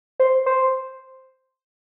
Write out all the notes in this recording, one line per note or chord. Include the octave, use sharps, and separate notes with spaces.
C5
C5